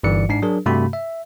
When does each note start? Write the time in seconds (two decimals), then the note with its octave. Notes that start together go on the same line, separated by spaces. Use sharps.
0.03 G1 G2 E3 D5 C#7
0.29 G#2 D4 C7
0.42 F#3 D4 G#4 A#4
0.66 G2 C3 A3 F#4 B5
0.93 E5